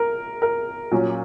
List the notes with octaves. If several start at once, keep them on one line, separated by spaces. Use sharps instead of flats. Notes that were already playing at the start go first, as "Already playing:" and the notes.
Already playing: A#4
A#4
A#2 F#3 C#4